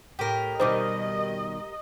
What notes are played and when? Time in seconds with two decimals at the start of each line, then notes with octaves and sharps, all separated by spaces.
0.19 A2 G4 A#4
0.60 B2 D#3 G3 C5 D#5 D6